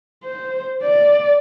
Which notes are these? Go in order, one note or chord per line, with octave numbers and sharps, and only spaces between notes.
C5
D5